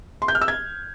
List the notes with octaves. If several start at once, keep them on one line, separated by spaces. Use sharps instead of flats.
C6
G6
F6
E6
G#6